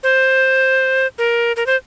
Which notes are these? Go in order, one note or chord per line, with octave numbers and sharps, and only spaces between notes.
C5
A#4
A#4
C5